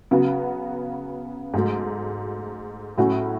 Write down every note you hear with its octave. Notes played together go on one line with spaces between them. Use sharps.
C#3 F#3 B3 F#4
G#2 F#3 A3
A2 F#3 C#4 F#4